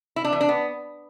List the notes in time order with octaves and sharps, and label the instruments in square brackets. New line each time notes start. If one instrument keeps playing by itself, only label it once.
[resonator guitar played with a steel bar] E4
D4
E3
D4
B3